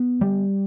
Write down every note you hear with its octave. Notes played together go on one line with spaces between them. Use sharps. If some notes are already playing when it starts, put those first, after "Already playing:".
Already playing: B3
G3